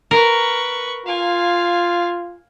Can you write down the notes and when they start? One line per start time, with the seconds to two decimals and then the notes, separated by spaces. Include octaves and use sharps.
0.11 A#4 B4 C#6
1.06 F4 F5 G#5